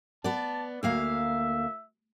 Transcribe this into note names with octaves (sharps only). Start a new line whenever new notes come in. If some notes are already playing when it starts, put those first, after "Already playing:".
B3 D5 A5
D2 A#3 E5 F5